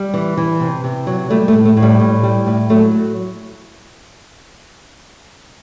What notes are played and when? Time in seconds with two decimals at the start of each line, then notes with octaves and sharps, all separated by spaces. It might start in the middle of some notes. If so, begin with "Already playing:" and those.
Already playing: G3
0.14 E3
0.37 E3
0.61 C3
0.84 C3
1.07 F#3
1.30 G3 A3
1.48 A3
1.53 A2
1.65 A3
1.77 A2
1.82 G3
2.00 A2
2.23 G3
2.47 A2
2.70 F#3 A3